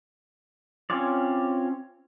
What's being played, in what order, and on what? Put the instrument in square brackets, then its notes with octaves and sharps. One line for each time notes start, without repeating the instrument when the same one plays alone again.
[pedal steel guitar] C4 C#4 F4 C#5 D5